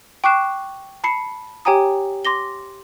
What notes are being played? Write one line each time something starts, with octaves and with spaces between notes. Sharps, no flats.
G5 C#6 D6 F#6 C7 E7
A5 B5 C7 C#7
G4 C#5 G5 G#5 A#5 D#6
C6 D6 A#6 G7